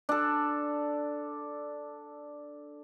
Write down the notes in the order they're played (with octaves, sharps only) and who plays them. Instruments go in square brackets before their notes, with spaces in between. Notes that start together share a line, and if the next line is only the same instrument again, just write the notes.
[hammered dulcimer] D4 A4